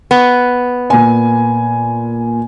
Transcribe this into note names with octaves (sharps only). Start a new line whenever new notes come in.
B3
A#2 G#5